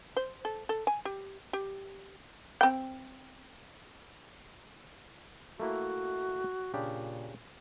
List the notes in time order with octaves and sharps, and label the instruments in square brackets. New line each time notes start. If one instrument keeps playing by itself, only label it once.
[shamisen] C5
A4
A4
G#5
G4
G4
C4 G5
[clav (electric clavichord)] A3 A#3 E4 [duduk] F#4
[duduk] A#2 [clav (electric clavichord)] C#3 D4 G4